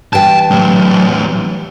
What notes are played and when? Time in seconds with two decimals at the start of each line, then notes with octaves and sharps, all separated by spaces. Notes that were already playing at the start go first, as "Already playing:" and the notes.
0.13 E3 G3 G5 A5
0.51 A2 F#3